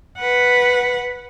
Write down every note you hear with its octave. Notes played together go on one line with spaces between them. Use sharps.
B4 F#5